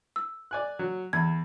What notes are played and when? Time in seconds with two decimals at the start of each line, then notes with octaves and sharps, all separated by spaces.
0.16 E6
0.51 D5 G#5 F#6
0.79 F#3
1.13 E2 E5 B5 G#6